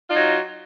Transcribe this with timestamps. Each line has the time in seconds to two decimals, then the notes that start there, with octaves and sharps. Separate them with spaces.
0.06 F4
0.10 D#4
0.14 F#3